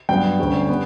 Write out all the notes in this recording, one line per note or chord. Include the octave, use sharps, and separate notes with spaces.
G2 F#3 B3 G5
D2 D3 G3 C#4
B3